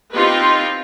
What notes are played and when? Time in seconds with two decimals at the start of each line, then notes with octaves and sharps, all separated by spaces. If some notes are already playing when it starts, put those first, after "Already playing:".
0.13 C4 D#4 F4 G4 B4